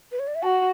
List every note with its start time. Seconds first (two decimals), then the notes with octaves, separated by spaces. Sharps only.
0.12 B4
0.19 C#5
0.28 D5
0.35 E5
0.43 F#4 F#5 A5